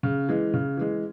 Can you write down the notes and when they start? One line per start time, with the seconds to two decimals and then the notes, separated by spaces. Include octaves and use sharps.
0.03 C#3
0.29 E3 G#3
0.54 C#3
0.77 E3 G#3